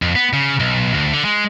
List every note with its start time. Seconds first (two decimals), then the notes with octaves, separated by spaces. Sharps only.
0.02 F2
0.16 B3
0.33 C#3
0.60 B1
0.94 D2
1.13 D3
1.25 G#3